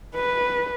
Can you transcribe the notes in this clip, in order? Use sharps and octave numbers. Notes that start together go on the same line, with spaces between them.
B4